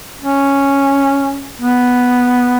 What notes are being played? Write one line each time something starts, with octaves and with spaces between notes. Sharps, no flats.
C#4
B3